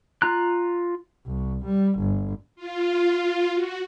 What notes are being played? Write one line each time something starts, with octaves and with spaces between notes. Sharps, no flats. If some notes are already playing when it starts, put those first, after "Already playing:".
F4 A#5 F#6
C2
G3
G1
F4
F#4